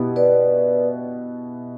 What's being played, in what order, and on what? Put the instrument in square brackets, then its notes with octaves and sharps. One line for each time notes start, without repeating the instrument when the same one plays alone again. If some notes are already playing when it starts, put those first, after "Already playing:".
Already playing: [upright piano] B2 B3 E4 G4
[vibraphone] B4 D5